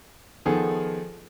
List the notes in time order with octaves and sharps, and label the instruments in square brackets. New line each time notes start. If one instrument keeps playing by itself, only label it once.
[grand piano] D#3 F3 B3 G#4 A4